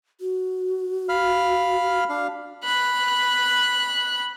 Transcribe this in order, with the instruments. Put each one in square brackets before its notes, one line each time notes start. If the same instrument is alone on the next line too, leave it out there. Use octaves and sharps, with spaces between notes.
[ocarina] F#4
[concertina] F5 B5 F6
D4 F5
[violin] B5 F#6